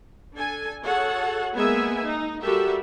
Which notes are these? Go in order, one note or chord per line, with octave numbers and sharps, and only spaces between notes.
D4 A4 G#5
F#4 G#4 A4 C#5 F#5
G#3 A#3 B3 G#4 E5 G#5
D#4
G3 F#4 G4 A4 A#4 E5